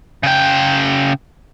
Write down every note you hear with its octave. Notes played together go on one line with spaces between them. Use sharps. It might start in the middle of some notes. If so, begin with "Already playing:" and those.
C#3 G5